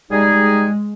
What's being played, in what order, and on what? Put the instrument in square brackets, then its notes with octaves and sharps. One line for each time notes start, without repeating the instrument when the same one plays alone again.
[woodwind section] G3 D#4 G#4 [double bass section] G#3